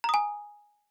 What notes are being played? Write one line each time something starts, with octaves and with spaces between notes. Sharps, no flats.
G#5 A#5 D#6